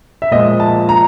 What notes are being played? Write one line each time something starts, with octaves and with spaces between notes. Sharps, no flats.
E5
A#2 F3 G#3 D#5
A5
A#5